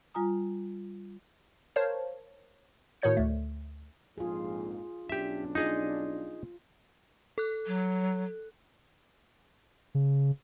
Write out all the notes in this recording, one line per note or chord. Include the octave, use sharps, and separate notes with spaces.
G3 F4 G#5 A#5 D#6
A#4 C5 C#5 F5 A5
A2 D#3 F#4 C#5 G6 C#7
D2 A3
A#1 F2 G#2 F4 G#4
B1 C#4 D4 G4 E5
D#4 F4 G#4 D#5
A4 F#6
F#3
C#3